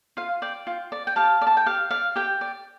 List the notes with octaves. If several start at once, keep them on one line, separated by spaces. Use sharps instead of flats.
F4 F5
D5 G5
F4
D5
G5
G4 F5 A5
D5
A5
G5
G4 F5
D5 F5
G4 G5
D5